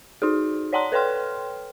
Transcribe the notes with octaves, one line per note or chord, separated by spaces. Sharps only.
D#4 F#4 G#4
C#5 D5 F#5 A5 A#5 C6
A4 B4 C#5 G5 C6 F6